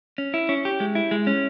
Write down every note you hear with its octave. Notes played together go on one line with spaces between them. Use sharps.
C#4
E4
C#4
G4
G#3
E4
G#3
C#4